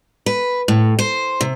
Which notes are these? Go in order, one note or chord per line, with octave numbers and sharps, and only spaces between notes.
B4
A2
C5
C3